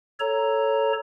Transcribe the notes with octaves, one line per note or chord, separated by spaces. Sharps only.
A4 C#5 A#5